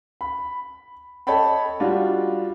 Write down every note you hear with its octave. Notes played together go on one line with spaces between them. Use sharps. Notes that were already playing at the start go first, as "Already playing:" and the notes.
B5
A4 C#5 D#5 G5 A5 B5
G3 D4 F4 F#4